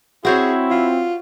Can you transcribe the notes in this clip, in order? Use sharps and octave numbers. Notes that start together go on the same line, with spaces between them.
C4 E4 F#4 G#4 C5 C#5
F4